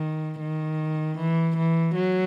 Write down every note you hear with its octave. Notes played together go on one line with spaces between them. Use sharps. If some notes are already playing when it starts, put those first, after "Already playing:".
Already playing: D#3
D#3
E3
E3
F#3